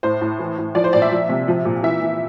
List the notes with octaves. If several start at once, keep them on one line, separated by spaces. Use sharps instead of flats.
A2 C5
A2
E3
A2
F3 D5
C5
A#2 D5
E5
F3
C3
F3
A#2
E3 E5
E3